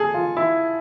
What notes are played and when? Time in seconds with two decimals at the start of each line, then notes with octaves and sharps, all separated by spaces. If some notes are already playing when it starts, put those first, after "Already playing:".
Already playing: G#4 A4
0.14 F4
0.37 E4